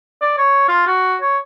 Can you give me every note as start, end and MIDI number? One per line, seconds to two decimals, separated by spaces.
0.21 0.34 74
0.38 0.64 73
0.69 0.87 65
0.87 1.15 66
1.22 1.38 73